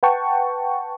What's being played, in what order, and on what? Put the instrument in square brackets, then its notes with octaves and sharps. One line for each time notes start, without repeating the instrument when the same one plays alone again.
[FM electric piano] B4 F#5 G5 A5 C#6